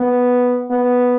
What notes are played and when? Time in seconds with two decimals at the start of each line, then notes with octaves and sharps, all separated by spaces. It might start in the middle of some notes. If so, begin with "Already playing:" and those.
Already playing: B3
0.71 B3